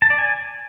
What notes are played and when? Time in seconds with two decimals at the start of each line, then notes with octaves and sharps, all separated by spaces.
0.02 A5
0.10 D5
0.18 G#5